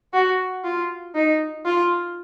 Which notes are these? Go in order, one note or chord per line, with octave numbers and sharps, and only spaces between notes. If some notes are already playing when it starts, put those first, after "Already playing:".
F#4
F4
D#4
F4